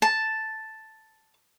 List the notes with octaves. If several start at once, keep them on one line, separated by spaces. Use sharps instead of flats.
A5